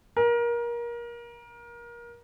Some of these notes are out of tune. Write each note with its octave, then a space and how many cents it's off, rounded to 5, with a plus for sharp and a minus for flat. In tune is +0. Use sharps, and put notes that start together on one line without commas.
A#4 +25